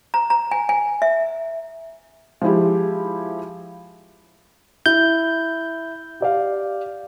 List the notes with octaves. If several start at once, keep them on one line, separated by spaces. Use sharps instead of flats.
A#5
A#5
G#5
G#5
E5
F3 G#3 E4 G4
E4 G6
G4 D5 F5